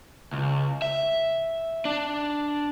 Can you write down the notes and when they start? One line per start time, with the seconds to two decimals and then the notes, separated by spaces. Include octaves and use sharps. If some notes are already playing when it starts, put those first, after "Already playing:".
0.33 C#2
0.82 E5
1.85 D4